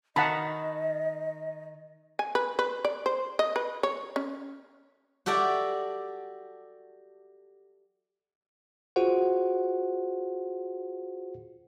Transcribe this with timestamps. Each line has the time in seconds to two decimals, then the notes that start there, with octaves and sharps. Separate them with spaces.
0.16 D#3 D#5 F#5 A5 B5
2.19 G#5
2.35 B4
2.59 B4
2.85 D5
3.06 C5
3.39 D#5
3.56 B4
3.83 C#5
4.16 C#4
5.26 F#4 G4 A4 D5 E5
8.96 F4 F#4 G#4 C5 F#5